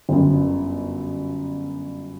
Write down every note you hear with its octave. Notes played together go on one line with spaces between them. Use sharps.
G1 F#2